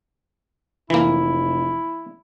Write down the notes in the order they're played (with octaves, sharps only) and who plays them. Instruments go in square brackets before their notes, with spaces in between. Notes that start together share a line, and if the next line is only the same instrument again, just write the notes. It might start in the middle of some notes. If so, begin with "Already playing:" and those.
[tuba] F1 [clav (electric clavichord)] E3 A#3 [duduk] E4